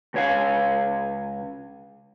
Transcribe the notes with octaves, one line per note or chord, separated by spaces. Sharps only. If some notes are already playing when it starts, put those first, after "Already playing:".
C#2 C#5 F5